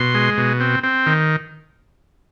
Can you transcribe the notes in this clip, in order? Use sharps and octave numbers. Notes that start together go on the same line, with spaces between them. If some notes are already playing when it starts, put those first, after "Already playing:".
Already playing: B2 C6
G#3
B2
C4
C4
D#3